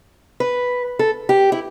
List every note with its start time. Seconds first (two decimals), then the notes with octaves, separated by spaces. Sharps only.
0.40 B4
0.99 A4
1.29 G4
1.52 E4